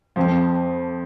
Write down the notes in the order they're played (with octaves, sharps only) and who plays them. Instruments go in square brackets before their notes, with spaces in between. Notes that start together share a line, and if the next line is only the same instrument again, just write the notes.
[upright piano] F2 [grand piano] F3